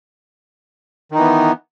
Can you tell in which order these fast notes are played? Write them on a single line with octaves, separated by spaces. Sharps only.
D#3 D#4 E3 B3